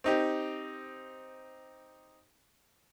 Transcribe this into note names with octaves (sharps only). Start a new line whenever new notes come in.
C4 D#4 G4